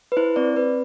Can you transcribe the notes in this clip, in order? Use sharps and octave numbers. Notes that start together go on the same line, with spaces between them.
B4
E4 C5
C4 D5
C4 B4